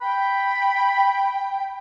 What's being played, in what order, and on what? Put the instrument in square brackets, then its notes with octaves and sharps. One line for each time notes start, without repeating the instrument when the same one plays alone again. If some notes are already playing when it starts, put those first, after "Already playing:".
[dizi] G5 [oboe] B5